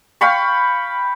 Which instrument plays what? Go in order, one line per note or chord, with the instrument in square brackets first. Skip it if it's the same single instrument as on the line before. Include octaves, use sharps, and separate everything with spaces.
[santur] F5 G5 B5 C#6